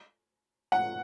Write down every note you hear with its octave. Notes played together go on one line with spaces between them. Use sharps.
F#5